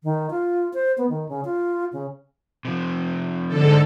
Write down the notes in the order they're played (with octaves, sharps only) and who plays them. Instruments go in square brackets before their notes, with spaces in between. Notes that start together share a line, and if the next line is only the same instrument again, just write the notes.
[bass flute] D#3
F4
C5
B3
D#3
C#3
F4
C#3
[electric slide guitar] C3 F3
[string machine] G#2 D3 A4